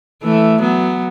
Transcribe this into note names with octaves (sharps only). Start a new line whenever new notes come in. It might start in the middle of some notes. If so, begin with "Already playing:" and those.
E3 A3
F#3 B3